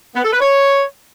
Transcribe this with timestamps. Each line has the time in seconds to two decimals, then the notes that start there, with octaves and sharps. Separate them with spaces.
0.14 B3
0.22 A4
0.31 B4
0.39 C#5